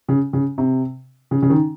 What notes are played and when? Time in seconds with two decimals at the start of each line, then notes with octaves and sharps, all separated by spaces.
0.09 C#3
0.33 C#3
0.58 C3
1.31 C#3
1.42 C#3
1.50 D#3